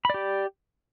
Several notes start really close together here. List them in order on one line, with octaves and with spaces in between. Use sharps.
B5 D5 G4